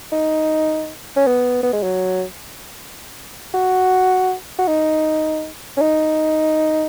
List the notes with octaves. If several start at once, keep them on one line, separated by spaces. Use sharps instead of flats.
D#4
C#4
B3
B3
G#3
F#3
F#4
F#4
D#4
C#4
D#4